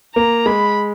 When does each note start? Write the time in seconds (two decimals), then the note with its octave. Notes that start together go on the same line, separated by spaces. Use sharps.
0.15 A#3 A#5
0.46 G#3 B5